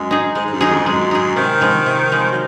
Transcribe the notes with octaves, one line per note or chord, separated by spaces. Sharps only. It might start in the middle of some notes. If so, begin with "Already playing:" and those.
Already playing: F#2 G#3
D#4 G#4
G#2 G#3
G#2
F#2
D#4 G#4
F2
F#2 G#3
D#4 G#4
C3 D#3
F3 G#3
C3
F3 G#3
F#3